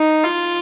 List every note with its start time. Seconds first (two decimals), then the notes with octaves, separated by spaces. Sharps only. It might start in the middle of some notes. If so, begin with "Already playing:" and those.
Already playing: D#4
0.24 F4